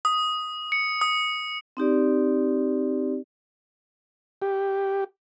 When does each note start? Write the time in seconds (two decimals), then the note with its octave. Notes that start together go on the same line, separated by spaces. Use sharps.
0.05 D#6
0.72 C#7
1.01 D#6
1.77 C4 D#4 G4 D5
4.42 G4